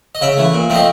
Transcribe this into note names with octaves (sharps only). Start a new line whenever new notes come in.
D#5
C#3 E5
E3 A3
A#2
F3 A3 C4 D#5